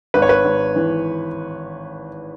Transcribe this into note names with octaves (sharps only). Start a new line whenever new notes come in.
G#1 B4
C#5
B4
G#1
E3